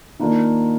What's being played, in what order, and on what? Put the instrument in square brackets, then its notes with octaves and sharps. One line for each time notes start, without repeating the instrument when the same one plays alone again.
[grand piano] D#3 A#3 D4 F4